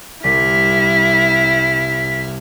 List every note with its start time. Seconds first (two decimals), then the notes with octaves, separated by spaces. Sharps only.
0.24 C2 E4 F6 B6